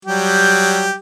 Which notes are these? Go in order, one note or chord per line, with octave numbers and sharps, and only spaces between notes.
F#3 G3 G4